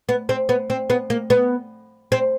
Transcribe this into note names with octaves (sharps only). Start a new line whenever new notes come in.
B3
C4
B3
C4
B3
A#3
B3
C4